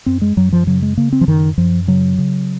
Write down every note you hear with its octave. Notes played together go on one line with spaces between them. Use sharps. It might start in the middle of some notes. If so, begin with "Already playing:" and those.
F#2 C4
G#3
F#2 F#3
F3
C#3 F#3
G#3
C#3 A#3
C4
F3
F#2 D#3
F#2 F3
C#3 F#3
C#3